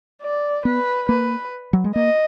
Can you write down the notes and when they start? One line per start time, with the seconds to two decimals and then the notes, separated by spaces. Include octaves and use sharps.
0.22 D5
0.65 B3 B4
1.09 A#3 B4
1.73 F#3
1.84 G#3
1.95 A#3 D#5